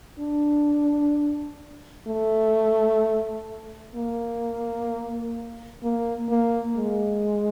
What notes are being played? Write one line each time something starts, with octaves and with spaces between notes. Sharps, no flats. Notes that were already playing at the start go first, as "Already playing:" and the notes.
D4
A3
A#3
A#3
A#3
G#3